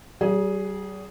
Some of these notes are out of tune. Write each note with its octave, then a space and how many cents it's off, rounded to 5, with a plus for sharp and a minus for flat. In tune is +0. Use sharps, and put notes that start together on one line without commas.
G3 -40 G#4 +0